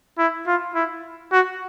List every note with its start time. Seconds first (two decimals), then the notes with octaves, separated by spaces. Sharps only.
0.19 E4
0.47 F4
0.75 E4
1.32 F#4